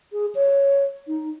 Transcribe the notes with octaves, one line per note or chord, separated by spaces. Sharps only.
G#4
C#5
D#4